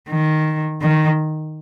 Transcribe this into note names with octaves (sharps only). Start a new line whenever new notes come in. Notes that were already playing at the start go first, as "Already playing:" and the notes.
D#3
D#3